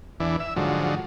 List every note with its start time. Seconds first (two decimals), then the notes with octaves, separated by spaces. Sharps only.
0.20 E2 E3 D4
0.40 E5
0.56 G#2 D3 F3 F#3